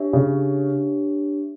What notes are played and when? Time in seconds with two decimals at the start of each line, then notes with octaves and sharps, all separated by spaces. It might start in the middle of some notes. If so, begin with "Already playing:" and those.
Already playing: D4 G4 C#5 E5
0.13 C#3